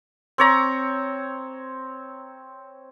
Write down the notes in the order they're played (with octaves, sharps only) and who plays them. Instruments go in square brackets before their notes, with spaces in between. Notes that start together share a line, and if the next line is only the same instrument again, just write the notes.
[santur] C4 C#5 A#5